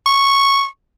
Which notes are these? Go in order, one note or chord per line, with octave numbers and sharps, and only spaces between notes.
C#6